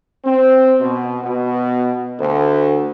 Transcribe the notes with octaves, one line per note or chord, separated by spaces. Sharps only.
C4
B2
B2
D2